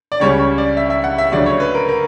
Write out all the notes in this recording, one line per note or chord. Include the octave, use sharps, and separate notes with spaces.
D5
C#2 C#3 G3 C#4 C#5
C#5
D5
E5
E5
F#5
E5
D2 C#3 F#3 D5
C#5
B4
A#4
A#4